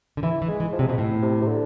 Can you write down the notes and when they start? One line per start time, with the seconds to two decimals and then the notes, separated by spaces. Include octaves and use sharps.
0.17 D3
0.23 E3 E4
0.42 E3
0.48 G#3
0.60 E3
0.73 F3
0.79 C3 G#3
0.88 B2 F3
0.98 A2
1.22 C3
1.42 C3
1.48 D3